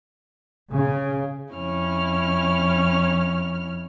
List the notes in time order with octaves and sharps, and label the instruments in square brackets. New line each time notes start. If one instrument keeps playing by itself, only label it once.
[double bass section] C#3
[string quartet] F2 C#4 E4 F6